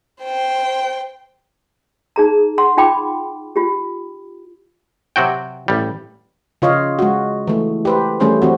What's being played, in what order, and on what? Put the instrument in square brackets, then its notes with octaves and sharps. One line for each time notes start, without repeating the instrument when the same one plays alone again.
[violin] C5 G5
[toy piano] D#4 G#4 A#5
F#5 C6
D#4 F4 G5 B5 D6
F4 G4
[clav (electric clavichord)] C3 F#3 F#4 G5
A1 G3
[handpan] C#3 F4 C#5 D#5 F5
G#3 F#4
E3 A3
G4 B4 C5
E3 G3 A3 C#4 G#4 C5
E3 C4 F#4